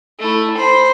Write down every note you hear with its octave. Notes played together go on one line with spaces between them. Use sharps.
A3 E4
C5 B5